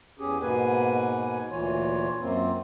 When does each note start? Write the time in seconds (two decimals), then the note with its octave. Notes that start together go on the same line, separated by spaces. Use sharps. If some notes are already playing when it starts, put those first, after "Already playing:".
0.19 E2 C#4 G4 G#4
0.42 G#2 B2 A#3 B4 G#5
1.50 D2 A#2 E3 F4 C#5
2.20 F#2 A#3 C4 F4